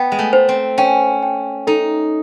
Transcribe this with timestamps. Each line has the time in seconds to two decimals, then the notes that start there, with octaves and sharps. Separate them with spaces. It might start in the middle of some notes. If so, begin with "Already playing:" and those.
Already playing: B3 G5
0.12 G#3
0.19 A3
0.33 C5
0.49 C4
0.78 C#4 G5
1.23 G5
1.67 D#4 A4